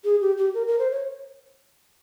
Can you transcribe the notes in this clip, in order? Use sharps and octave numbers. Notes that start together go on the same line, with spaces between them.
G#4
G4
G4
A#4
A#4
C5
C#5